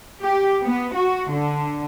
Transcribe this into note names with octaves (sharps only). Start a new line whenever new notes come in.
G4
B3
F#4
D3